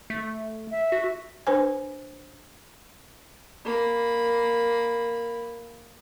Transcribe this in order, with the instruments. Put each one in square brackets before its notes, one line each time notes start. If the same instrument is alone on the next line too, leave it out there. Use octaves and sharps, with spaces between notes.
[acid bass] A3
[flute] E5
[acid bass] F#4
[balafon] D4 B4 C5 G#5
[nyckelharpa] A#3 B5